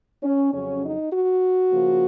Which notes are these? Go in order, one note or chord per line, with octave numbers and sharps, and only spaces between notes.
C#4
F2 C#3 F#3 C#4
D#4
F#4
C#3 F3 A#3